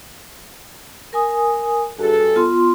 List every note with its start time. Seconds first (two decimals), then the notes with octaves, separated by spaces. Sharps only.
1.13 A#4 G#5 D#6
1.99 G2 F#4 G#4 A4
2.35 B3 F4 C6